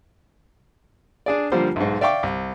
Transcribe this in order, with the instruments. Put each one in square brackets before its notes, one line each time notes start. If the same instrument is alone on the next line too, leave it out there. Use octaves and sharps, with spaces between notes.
[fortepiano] D4 G#4 D5
D3 F3 G3 A#3 C5
B1 G#2
D5 E5 F5 G5 C#6 D6
C2